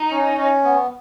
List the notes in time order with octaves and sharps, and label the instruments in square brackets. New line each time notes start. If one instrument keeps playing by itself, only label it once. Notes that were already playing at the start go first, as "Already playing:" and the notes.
Already playing: [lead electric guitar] D#4
[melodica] C#4
C#4
B3